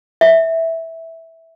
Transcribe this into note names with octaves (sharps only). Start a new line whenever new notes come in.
E5